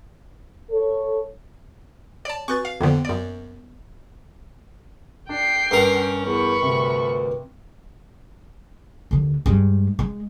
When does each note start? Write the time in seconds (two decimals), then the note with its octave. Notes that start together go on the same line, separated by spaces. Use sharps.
0.71 A4 C#5
2.25 C#5 D5 A5
2.48 C4 F#4 B4 C#6 F#6 A6
2.65 F5
2.81 F2 D3 A#3 B3 C5
3.05 F#2 D5
5.29 D4 G5 C7
5.71 G2 C#4 A#4
6.25 E2 B5 C#6
6.62 D2 C3
9.11 D#2 D3
9.46 G2 G#3
9.99 G#3